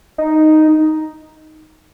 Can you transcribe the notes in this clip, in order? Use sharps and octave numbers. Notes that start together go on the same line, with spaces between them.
D#4